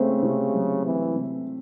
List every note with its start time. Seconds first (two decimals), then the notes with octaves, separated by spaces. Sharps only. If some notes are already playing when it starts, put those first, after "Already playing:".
Already playing: C#3 A3 C4
0.23 C3
0.54 F#3
0.85 E3 C4
1.16 C3